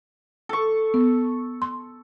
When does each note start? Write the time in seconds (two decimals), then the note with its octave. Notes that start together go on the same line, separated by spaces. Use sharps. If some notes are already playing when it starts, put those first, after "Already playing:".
0.49 A4 C#6
0.94 B3
1.62 C6